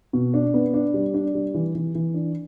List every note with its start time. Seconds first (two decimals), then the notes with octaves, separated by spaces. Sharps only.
0.13 B2
0.34 D4
0.54 B3
0.74 D4
0.94 G3
1.14 D4
1.35 G3
1.54 E3
1.75 E3
1.95 E3
2.14 D4